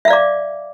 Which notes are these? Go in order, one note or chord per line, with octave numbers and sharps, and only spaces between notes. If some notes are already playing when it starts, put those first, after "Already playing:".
D5 E5 F5 D6